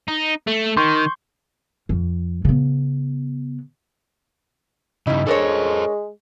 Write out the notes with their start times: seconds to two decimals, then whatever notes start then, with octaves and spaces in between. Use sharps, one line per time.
0.08 D#4
0.47 A3
0.77 D#3 C6 C#6 G6
1.89 F2
2.45 C#3 B3
5.07 G2 C#3 G3 D#4 E4
5.27 G#3 D4 A4 A#4 C5 C#5